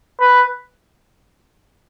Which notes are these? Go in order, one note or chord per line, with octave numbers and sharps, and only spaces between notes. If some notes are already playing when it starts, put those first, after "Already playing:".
B4